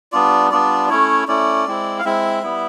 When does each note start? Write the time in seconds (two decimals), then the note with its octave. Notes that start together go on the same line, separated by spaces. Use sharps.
0.12 G3 B3 D4 F4 D5
0.51 G3 B3 D4 F4 D5
0.89 A3 C#4 E4 C#5
1.28 A3 C#4 E4 D5
1.66 G#3 C4 E4
1.99 F5
2.05 G#3 C4 E4 E5
2.43 G3 B3 E4